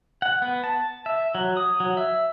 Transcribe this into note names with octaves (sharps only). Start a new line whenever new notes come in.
F#5
B3
A5
E5
F#3
D#6
F#3
E5